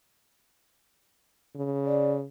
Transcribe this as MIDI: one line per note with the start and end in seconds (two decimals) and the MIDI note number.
1.55 2.26 49
1.85 2.12 74